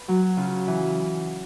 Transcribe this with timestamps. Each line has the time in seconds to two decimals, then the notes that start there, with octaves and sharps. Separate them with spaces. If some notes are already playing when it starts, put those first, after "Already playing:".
Already playing: B4
0.08 F#3
0.37 C#3 F4
0.67 E3